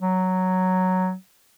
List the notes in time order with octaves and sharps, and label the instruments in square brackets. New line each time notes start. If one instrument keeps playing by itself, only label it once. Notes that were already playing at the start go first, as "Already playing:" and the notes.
[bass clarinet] F#3